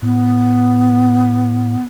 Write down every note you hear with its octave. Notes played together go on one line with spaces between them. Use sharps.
A2 B3